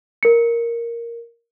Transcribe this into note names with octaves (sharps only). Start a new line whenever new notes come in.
A#4 C#7